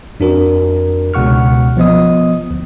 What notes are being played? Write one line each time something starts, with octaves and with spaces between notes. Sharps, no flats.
F2 D4 F#4 A#4
C#2 B2 F#5 C#6 F6
F3 B3 D#5 D#6
D2